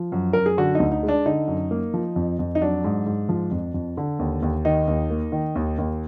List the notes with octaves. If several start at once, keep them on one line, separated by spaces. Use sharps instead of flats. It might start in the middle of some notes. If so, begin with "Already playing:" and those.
Already playing: F3
F#2
F#2 A#4
G#4
D3 F#4
D2 D#4
D#4
G#3
D4
D3 D#4
F#2
A#3
F3
F2
F2
D#4
F#3 D4
G#2
G#2
F3
F2
F2
D3
D#2
D#2
D#3 D#4
D#2
A#3
D#3
D#2
D#2